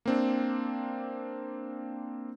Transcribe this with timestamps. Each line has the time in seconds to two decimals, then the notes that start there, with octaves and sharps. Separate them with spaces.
0.06 A#3 C4 D4